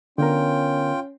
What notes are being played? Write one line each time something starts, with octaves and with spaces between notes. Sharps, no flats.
D3 B3 C#4 F4 A#4 G5